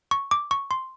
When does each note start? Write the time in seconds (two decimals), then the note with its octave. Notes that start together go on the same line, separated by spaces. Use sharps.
0.11 C#6
0.31 D6
0.51 C#6
0.71 C6